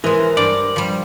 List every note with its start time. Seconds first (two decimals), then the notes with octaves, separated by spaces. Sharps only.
0.04 E3 G#3 A#4 C5 D#5
0.37 G2 D5
0.76 F3 G3